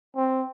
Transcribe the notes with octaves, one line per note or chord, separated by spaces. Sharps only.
C4